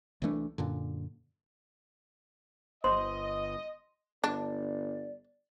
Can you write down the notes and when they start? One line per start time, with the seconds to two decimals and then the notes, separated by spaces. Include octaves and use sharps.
0.22 C2 E3 A3 D4
0.58 F#2 A#2 D3
2.84 G1 C5 D#5 C6
4.24 G1 D4 D5